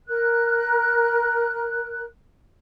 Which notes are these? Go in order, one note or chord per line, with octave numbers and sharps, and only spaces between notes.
A#4 F#6